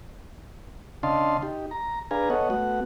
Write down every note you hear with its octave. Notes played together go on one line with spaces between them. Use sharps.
C#3 D4 D#5 F5 A5 C6
D#4 G4
A#5
D4 G#4 B4 F5 G#5 A#5
B3 A4 C#5 D#5 F#5
A3 B3 F#4 F#5